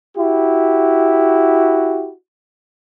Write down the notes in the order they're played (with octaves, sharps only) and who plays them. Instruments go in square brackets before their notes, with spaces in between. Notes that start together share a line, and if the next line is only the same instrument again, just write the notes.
[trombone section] E4 F#4 G4